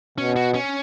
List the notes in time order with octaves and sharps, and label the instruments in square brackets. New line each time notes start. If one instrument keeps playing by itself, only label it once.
[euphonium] B2 [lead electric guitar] C#4
[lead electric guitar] F#4
C#4